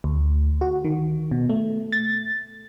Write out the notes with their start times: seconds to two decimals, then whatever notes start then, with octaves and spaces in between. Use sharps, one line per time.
0.04 D2
0.61 F#4
0.85 D#3
1.31 B2
1.50 A3
1.92 A6